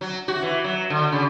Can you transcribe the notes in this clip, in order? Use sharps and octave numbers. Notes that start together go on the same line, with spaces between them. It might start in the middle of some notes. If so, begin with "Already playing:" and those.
F#3
F#4
E3
F#3
D3
C#3